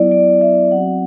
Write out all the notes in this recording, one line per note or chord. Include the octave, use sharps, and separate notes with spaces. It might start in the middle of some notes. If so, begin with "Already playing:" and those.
Already playing: F#3 B3 E4 D5
D5
E5
F#3 C4 F#4 F#5